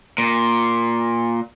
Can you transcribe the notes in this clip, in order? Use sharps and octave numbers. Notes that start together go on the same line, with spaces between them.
A#2